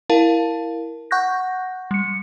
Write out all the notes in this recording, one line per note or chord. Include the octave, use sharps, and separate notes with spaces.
E4 A#4 F5 A5
F#5 C#6 F#6 G6 A#6
G3 C#7